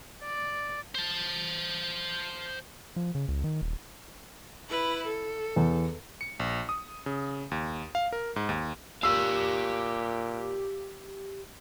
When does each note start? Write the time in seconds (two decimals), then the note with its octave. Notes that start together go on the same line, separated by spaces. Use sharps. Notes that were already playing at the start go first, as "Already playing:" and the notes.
0.23 D5
0.95 C5 A5
2.96 F3
3.15 C#3
3.28 C#2
3.44 D#3
3.62 D#1
4.69 E4 B4
5.06 A4
5.56 E2
6.21 C#7
6.40 A#1
6.69 D#6
7.06 C#3
7.51 D#2
7.95 F5
8.13 A#4
8.36 G#2
8.49 D#2
9.03 A#2 G4 F5 E6